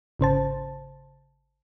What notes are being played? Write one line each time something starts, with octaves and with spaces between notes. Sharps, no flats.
G#1 C#3 C5 A5